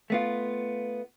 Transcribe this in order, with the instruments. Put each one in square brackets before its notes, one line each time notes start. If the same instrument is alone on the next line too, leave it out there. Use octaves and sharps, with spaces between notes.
[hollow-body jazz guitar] A3 B3 F4